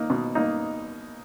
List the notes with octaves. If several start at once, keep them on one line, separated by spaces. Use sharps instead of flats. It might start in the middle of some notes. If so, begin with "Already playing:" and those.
Already playing: A#3 D#4
B2
A#3 D#4